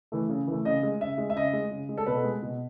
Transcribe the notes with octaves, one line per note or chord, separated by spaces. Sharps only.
E3 A3
C#3
E3 A3
C#3 D#5
G#3
C#3 E5
G#3
E5
C#3 D#5
G#3
C#3
G#3
A4
B2 B4
G#3
B2